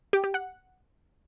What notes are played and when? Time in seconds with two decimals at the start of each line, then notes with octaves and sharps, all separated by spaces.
0.13 G4
0.24 G4
0.34 F#5